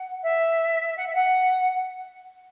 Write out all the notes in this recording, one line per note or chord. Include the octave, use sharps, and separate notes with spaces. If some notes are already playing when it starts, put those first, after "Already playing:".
Already playing: F#5
E5
F#5
E5
F#5